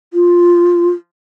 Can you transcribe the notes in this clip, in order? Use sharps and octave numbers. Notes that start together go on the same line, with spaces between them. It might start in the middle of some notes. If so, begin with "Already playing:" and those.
F4